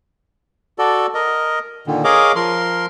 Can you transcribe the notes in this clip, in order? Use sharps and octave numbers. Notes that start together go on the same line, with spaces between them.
F#4 A4 D5
A#4 D#5
A#2 D3 D#3
G#4 A#4 C#5 D#5 F5 D6
F3 A#4 C6